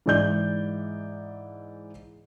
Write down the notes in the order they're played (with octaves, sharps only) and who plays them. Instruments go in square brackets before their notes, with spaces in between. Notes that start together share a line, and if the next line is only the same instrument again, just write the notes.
[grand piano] G#2 E3 D5 D#5 G6 G7